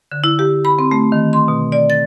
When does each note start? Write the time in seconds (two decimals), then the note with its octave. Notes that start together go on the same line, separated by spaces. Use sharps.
0.12 D3
0.24 E4
0.39 G4
0.65 B5
0.79 C4
0.91 A3
1.12 D#3
1.33 C6
1.48 B2
1.72 D5
1.90 A6